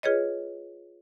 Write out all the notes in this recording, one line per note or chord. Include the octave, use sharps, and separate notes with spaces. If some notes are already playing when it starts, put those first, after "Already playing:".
F4 G#4 B4 C#5 D#5